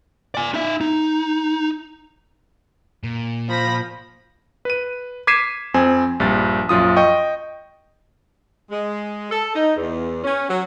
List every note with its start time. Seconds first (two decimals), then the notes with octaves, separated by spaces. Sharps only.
0.35 D5 G#5
0.54 D#4 E5
0.81 D#4
3.04 A#2
3.49 F3 B5 A#6
4.65 B4 D#7
5.27 D6 G#6 B6 C7 D#7 E7
5.74 F2 C4 G#5
6.20 A#1 G2 A6
6.69 A#1 F#2 F4 D#6
6.96 D#5 G5 C#6
8.70 G#3
9.31 A4
9.55 D#4
9.76 E2
10.24 C#4
10.49 F#3